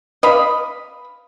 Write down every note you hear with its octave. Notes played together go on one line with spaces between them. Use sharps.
D#5 F5 B5